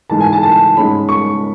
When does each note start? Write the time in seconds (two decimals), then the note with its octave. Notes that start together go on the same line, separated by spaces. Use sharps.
0.10 G#2 E3 G#3 A5
0.21 G#5
0.33 A5
0.43 A5
0.76 G#2 G#3 C#4 B5
1.09 C#6